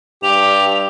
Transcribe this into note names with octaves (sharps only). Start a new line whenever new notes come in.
G2 G4 F7